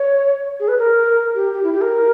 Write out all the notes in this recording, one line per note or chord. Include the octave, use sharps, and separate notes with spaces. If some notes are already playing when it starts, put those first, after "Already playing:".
Already playing: C#5
G#4
B4
A#4
G4
G4
E4
G4
A#4